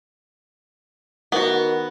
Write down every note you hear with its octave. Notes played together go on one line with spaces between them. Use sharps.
D#3 B3 F#4